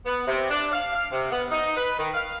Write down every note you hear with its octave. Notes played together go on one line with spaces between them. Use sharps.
B3
C3
D4
F5
F5
C3
B3
D#4
B4
D#3
F5